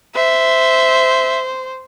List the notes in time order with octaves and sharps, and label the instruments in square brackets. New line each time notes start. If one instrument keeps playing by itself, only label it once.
[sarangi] C5 [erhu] E5